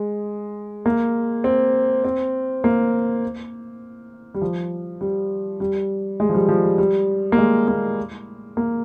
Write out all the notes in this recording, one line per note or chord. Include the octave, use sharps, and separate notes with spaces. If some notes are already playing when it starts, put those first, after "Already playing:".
Already playing: G#3
A#3
C4
C4
A#3
G3
F3
G3
G3
G#3
F3
G3
F3
G3
G3
A#3
G#3
A#3
A#3